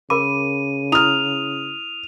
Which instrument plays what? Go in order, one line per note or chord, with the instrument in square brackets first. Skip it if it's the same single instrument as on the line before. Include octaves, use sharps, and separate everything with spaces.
[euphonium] C#3 [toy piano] A#4 B5 D6 [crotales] D#7
[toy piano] E4 [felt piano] D#6 F6 [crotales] F7